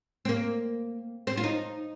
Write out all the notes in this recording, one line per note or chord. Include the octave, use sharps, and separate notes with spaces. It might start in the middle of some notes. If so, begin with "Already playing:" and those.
C4
A#3
C4
F4
D#4